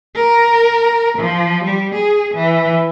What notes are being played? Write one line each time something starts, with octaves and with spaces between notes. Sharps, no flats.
A#4
F3
G3
G#4
E3